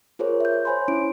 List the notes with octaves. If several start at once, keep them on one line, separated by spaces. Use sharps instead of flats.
F4 G#4 A#4 C5 C#5
E5 G6
C5 C#5 G#5 B5 C6
C#4 E4 D7